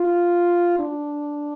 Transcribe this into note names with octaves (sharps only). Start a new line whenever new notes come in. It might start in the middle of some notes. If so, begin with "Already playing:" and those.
Already playing: F4
D4